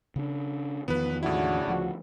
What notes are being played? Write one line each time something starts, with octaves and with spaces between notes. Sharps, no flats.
C#3 C4 D4
E2 D#3 F3 B3 B4
A2 C#3 D4 E4 F#4
D2 F3